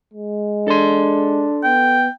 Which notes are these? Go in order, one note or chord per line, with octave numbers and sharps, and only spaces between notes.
G#3
D4 A4 C6
B3 G5